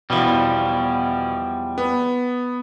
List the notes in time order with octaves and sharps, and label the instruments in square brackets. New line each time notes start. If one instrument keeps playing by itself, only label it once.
[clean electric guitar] E2 F3 G3 [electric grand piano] B2 E4
[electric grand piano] B3